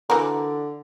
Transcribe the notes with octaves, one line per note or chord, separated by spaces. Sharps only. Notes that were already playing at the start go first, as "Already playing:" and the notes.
D3 E3 F#4 A#4